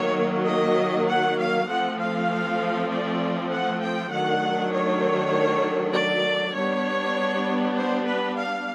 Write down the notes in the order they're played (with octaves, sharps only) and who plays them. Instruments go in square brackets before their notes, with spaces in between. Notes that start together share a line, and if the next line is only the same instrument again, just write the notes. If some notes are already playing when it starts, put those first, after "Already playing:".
Already playing: [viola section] D#3 F#3 A#3 C#5
D#5
F#5
F5
F3 A3 C4 F#5
F5
D5
F#5
G5
D#3 F#3 A3 D4 F#5
C#5
D5
G3 B3 D4 C#5
C5
B4
F5